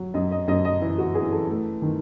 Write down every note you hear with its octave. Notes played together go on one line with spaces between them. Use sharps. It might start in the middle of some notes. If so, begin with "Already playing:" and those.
Already playing: F#3
F#2 D#5
D#5
F#2 D#5
D#5
E3 E4
F#4
E3 G#4
A4
A3
D#3